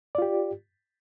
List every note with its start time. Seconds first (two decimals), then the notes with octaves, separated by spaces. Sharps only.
0.15 D5
0.18 F4
0.22 G4